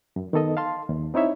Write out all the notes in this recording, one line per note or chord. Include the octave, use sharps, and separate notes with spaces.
F#2
D#3 B3 A4 D#5
F5 A5 C6
D#2
C4 D#4 E4 C#5 E5